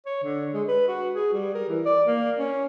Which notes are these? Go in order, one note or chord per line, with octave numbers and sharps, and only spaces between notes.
C#5
D3
G#3
B4
F#4
G#4
G3
A#4
E3
D5
A#3
C#4